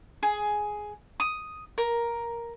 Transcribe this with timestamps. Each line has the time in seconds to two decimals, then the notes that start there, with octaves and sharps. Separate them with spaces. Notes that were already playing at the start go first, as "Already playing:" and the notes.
0.23 G#4
1.20 D#6
1.78 A#4